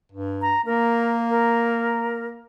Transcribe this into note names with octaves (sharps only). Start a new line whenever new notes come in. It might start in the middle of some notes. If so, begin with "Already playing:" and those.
G2
A#5
A#3 A#4
A#4